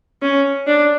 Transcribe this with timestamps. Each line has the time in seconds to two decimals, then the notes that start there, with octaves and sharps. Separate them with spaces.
0.22 C#4
0.67 D4